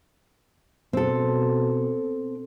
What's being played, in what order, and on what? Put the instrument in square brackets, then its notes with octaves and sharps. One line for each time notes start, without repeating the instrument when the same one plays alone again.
[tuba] B2 [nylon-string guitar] C4 A4